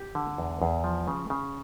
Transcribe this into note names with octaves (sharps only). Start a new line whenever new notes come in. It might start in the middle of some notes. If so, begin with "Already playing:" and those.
Already playing: G4
D3
E2
E2
F3
C#3
C#3